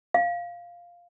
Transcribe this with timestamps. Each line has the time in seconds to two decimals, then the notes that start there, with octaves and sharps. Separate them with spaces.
0.14 F5